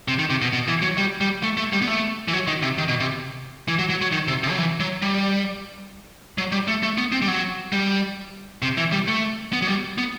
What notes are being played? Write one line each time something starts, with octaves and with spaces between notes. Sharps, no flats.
C3
D#3
C3
B2
B2
E3
F#3
G3
G3
A3
A3
G3
B3
A3
E3
F#3
D#3
C3
D#3
B2
C3
E3
F#3
F#3
F#3
D#3
C3
C3
F#3
E3
F#3
G3
F#3
G3
A3
A3
B3
C4
G3
F#3
G3
C3
E3
G3
A3
B3
F#3
G3
B3